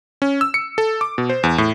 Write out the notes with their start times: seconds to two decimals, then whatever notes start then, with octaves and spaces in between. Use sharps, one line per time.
0.22 C#4
0.41 E6
0.54 C#7
0.78 A4
1.01 D6
1.18 B2
1.30 C5
1.43 E2
1.58 A2